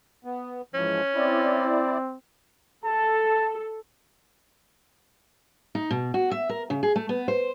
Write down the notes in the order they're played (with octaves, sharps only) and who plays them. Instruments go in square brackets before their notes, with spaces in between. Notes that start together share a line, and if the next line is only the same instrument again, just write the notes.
[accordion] B3
[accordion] G#2 E3 F3 [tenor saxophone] C#4
[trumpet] C4 [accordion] E4 D5
[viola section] A4 [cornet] A5
[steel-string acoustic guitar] D#4
B2
F#4
E5
A#4
C#3
G#4
A3
B3
C5